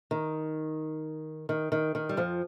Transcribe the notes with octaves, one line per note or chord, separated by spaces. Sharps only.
D#3
D#3
D#3
D#3
G3
F2 F3